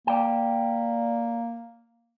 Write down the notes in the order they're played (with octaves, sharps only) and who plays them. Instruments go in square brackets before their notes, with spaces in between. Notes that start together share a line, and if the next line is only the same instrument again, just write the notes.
[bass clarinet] A#3 [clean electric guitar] D5 G5